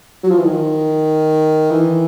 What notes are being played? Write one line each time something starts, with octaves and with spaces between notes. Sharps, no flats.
F#3
F3
E3
D#3
E3